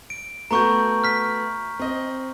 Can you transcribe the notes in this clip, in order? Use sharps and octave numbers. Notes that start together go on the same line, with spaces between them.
D7
A3 B3 F#4 A#5 C#6 G6
F6 B6
C4 D#5